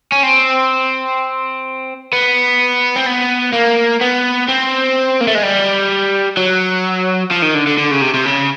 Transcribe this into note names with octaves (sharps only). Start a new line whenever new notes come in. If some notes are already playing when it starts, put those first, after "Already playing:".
C#4
C4
B3
C4
B3
A#3
B3
C4
A#3
A3
G#3
G3
F#3
F3
D#3
D3
D3
D3
C#3
C3
C3
C#3